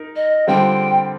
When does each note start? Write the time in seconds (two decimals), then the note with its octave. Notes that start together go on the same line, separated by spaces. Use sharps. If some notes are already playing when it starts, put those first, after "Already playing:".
Already playing: D#4 A#4
0.16 D#5
0.47 D3 G3 C4 F4 G5